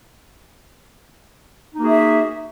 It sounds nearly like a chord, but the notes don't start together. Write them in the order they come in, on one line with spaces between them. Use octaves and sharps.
D#4 A#3 F#4 G#4 E5